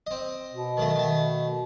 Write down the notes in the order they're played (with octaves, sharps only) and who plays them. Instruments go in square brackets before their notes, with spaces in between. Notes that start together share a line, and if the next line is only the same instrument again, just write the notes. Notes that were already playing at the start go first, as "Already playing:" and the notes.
[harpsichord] C4 D#5
[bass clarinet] B2
[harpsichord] D#3 F#3 A3
D#3 A3